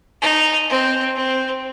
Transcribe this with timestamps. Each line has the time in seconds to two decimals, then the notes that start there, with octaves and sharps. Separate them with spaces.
0.22 D#4
0.70 C4
1.16 C4